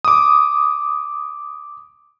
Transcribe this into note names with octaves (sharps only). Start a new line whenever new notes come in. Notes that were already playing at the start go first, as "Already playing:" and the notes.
D6 D#6